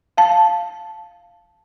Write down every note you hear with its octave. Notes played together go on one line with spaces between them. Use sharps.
F5 A5